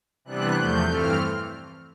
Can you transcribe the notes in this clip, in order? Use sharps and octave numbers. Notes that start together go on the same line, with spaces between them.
C3 E3 G3 B3 D4 F#6
E2 C3 F3 A3 G6
G2 E3 A3 C4 F6